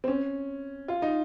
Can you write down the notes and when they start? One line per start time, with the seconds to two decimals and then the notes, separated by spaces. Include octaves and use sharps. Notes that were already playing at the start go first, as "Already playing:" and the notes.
0.04 C4
0.08 C#4
0.88 F4
1.02 D#4